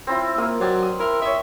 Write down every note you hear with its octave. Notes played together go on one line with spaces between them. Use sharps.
C4 E4 F4
A#3 F4 A#4 D#6
F#3 C5 D5 G5
D#6
E4 A#4
C#5 D#5 E5